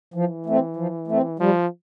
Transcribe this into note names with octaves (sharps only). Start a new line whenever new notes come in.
E3 F3
A3 C4
F3
A3 C4
F3 G3